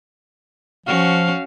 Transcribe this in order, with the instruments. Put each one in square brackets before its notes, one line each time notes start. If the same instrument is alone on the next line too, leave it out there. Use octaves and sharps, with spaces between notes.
[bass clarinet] F3 [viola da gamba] C#4 F#4 [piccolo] F5